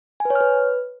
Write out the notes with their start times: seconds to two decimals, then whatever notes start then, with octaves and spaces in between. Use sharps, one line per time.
0.20 G#5
0.25 B4
0.30 C#5
0.35 F6
0.41 B4